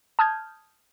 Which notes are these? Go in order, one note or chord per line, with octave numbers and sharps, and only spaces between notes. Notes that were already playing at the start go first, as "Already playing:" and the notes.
A5 D#6 F6 G6 G#6